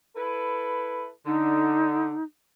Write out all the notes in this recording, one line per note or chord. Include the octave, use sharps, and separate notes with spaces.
E4 A4 B4
D3 D#4